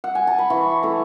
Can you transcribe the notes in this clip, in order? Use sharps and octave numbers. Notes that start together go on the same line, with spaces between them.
F#5
G#5
A5
B5
E3 C#6
A3 E4